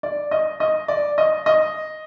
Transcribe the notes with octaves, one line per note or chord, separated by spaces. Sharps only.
D5
D#5
D#5
D5
D#5
D#5